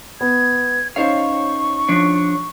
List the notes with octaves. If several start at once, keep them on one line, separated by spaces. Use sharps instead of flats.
B3 G#6
C#4 D#4 C5 C#5 F5 C#6
F3 D4 C#5